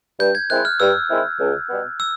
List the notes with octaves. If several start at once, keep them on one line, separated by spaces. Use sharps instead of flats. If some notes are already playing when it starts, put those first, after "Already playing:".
G2 G6
G#6
D#3 G#3 C4 E4 F#6
F6
G2 E6
D#3 G#3 C4 E4
C#2
B2 G3 B3
E6